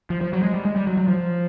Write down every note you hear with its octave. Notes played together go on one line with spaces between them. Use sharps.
F3
F3
F#3
G#3
G3
G#3
G3
F#3
F#3
F3